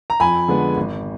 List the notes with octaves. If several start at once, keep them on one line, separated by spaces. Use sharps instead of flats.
A#5
F2 G#5 B5
D3 G#3 B3
G#1